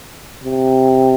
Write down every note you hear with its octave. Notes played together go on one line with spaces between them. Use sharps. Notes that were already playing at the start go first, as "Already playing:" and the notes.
C3